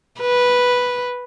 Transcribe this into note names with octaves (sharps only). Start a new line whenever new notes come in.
B4